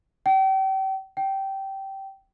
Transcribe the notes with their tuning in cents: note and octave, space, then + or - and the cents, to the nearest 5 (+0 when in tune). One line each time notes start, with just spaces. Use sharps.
G5 -35
G5 -15